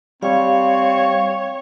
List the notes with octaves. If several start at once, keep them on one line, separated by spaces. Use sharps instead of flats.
G3 C4 C#5 F5